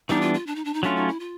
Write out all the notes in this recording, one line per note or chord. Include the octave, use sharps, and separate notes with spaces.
E3 G3 B3 D4 D#4
F4
F4
D4
D#4
D4
D#4
F#3 A3 C#4 D4 F4
D#4
E4
F4